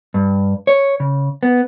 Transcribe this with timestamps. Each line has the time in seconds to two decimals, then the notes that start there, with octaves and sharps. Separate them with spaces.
0.14 G2
0.67 C#5
1.00 C#3
1.43 B3